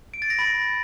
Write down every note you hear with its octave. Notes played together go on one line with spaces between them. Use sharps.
D7
A6
A#6
B5